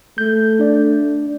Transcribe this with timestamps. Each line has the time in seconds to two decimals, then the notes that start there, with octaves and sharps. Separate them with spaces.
0.18 A3 G6
0.59 D4 D5